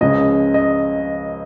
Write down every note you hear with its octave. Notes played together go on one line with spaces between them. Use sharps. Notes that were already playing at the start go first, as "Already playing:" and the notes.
C#2 C#3 F3 D#5
D#5